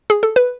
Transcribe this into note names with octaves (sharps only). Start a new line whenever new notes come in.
G#4
A4
B4